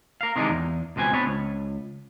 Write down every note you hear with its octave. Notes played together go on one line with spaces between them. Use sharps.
A#4 F5
C3 D#3 E3 G#3 D4 D#4
E2
C#2 B2 C4 B4 G#5
B3 C4 D4 B4 C#5
C#2